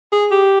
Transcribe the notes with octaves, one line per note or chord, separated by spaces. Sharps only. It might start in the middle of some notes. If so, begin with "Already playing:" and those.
G#4
G4